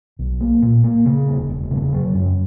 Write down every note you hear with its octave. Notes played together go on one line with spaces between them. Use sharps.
B1
A#3
A#2
A#3
C#3
E1
E1
C#3
F#3
F#2